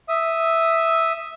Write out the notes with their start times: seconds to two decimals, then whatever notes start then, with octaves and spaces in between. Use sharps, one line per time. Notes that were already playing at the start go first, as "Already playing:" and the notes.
0.09 E5 D#6